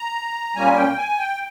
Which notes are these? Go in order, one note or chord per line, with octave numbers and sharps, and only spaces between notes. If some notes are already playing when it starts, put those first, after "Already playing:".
Already playing: A#5
A#2 G3 A#3 C#4 G#5
G5
G#5
G5